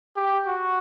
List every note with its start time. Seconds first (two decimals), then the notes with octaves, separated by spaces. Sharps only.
0.16 G4
0.46 F#4